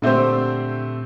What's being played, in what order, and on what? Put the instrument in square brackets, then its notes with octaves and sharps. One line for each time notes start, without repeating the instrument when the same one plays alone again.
[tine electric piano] A#2 [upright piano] D3 A3 C4 G4 C5